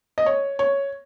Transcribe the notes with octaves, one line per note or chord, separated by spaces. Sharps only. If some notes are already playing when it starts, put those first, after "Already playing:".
D#5
C#5
C#5